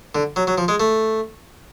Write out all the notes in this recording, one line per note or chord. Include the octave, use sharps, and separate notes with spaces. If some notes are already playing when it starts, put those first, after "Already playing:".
D3
F#3
F#3
F3
G#3
A3